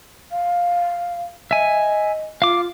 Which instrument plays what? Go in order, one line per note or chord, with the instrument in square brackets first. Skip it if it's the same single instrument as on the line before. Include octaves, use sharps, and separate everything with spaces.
[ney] F5
[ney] D#5 [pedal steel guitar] E5 G#5
[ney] F4 [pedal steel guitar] F5 D6